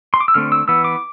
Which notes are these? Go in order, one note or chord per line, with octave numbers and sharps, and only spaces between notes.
C6
D6
E6
D3 A3 C4 F6
E6
E3 B3 E6
D6